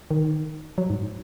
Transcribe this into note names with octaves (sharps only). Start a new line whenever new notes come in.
D#3
F#3
G#2